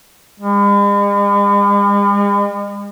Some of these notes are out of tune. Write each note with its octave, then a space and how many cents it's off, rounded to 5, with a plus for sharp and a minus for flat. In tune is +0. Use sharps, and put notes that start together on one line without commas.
G#3 -45